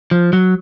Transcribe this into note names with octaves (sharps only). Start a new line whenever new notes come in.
F3
F#3